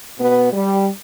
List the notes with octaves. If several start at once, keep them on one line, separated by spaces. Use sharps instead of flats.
B2 B3
G3